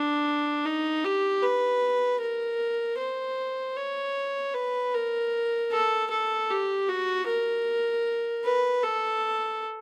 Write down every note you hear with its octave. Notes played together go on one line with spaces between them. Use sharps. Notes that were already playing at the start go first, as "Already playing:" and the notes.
Already playing: D4
D#4
G4
B4
A#4
C5
C#5
B4
A#4
A4
A4
G4
F#4
A#4
B4
A4